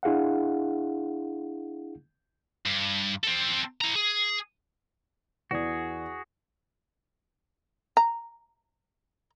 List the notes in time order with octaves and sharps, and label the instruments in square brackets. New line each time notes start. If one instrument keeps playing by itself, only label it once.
[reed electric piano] D4 E4 G#4 F5 F#5
[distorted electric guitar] G2
C4 A4
E4 A#5
G#4
[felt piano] E2 D5 [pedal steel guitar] F#4 G#4
[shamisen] A#5